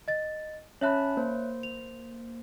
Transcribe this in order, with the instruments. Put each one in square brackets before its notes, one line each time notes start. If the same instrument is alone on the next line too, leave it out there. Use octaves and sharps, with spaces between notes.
[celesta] D#5 A6
[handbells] C#4 A5 B5 [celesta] C#5 E5 F#6
[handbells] A#3 C5
[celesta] F7